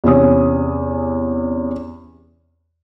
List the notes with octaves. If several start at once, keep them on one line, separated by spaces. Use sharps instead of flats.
E2 C3 C#4 D#6